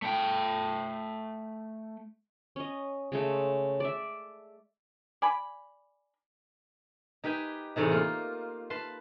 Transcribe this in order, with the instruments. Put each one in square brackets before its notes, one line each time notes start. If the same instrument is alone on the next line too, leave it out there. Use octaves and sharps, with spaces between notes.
[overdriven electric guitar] A3 G5
[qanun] C#4 D#5
C#3 G#3 A3
D5 E5
[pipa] D5 G#5 B5
[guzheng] D#4 G4 B4 G5 G#5
E2 A2 C3 D#4
A#3 F4
B4 A5 C6